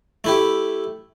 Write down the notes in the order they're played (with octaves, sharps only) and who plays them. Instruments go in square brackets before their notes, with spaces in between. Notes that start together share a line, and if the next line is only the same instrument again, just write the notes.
[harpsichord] A3 E4 G4